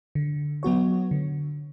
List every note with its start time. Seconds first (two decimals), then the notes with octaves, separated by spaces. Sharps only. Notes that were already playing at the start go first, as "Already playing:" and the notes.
0.15 D3
0.63 F#3 B3 F#4 C#5
1.11 D3